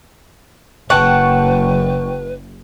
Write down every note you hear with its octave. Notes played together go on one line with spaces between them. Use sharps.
F#1 B4 F#5 G5 A5 C#6